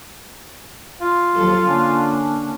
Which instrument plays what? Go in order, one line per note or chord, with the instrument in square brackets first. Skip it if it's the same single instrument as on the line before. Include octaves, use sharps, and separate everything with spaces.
[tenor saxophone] F4
[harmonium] D#2 F3 [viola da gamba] F#3 A4
[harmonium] D3 C#4 D4 [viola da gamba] A#3